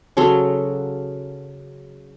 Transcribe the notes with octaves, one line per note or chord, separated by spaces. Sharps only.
C#3 F#3 A4 C6